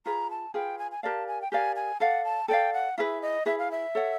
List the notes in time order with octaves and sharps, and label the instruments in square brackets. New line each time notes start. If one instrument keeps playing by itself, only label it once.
[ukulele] F4 G#4 B4 [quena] A#5
[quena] A5
[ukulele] F4 G#4 B4 [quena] G5
[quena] G#5
G#5
[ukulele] G4 A#4 D5 F5 [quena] A5
[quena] G#5
G5
[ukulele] G4 A#4 D5 F5 [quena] G#5
[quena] G#5
[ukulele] A4 D5 F5 [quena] F#5
[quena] A5
[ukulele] A4 D5 F5 [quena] G5
[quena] F#5
[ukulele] E4 G#4 B4 [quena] E5 F5
[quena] D#5
[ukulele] E4 G#4 B4 [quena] E5
[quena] F5
E5
[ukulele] A4 C#5 F#5